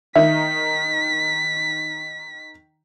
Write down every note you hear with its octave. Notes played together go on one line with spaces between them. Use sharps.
D#3 D#4 E5 B6